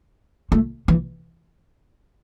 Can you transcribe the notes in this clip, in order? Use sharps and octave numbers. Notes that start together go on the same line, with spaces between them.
A3
E3